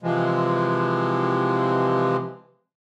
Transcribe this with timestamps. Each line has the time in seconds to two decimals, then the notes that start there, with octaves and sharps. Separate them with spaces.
0.03 C3 E3 F3 G#3